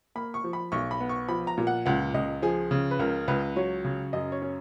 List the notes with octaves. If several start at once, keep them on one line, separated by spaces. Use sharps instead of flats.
A#3 B5
C#6
F3
B5
B1 C#6
B5
B3
C#6
F3 B5
A#5
A#2
F#5
C#2 F#5
C#2 D#5
F3 G#4
C#3
B4
C#2 A#4
C#2 B4
F#3 C#5
C#3
F#2 D#5
C#5
C#4